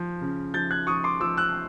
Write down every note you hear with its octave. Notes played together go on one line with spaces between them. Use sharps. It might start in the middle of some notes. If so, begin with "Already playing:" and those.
Already playing: F3
C#3
F3 G6 A6
F#6 G#6
F3 C#6 D#6
C6 D6
F3 D6 E6
E6 F#6